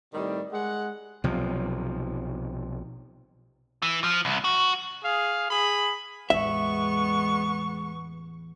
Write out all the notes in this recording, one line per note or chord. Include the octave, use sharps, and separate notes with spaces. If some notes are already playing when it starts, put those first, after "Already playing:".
A2 C3 D#3 G3
G#3 F#5
B1 C3 F3
E3
F3
C2
F#4
G#4 F5
G#4 B5
A1 E2 G#3 B3 E5 C#6